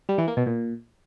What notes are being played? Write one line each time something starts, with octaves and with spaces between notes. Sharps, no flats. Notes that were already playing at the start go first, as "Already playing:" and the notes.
G3
E3
A#3
B2
A#2